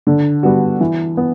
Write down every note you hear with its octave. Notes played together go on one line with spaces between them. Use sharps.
D3
G3 B3 F#4
E3
B3